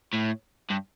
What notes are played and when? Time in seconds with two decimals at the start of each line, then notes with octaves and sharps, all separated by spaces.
0.14 A2
0.70 G2